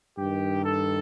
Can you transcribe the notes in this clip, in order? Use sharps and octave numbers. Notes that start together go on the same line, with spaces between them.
G2 D#3 G4
A4